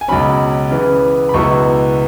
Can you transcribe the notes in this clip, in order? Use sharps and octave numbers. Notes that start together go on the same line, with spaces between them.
G#5
C#2 B2 F#3 C#4 B5
C#3 E3 B3
B5
C#2 B2 F#3 B3 E4 C#6